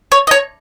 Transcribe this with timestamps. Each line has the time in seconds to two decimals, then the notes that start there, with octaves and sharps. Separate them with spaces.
0.12 C#5
0.27 D#5
0.31 C#5